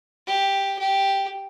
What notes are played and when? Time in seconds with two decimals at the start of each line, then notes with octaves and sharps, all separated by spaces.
0.27 G4
0.79 G4